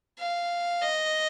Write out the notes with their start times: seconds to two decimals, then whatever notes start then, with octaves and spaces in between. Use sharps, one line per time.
0.19 F5
0.82 D#5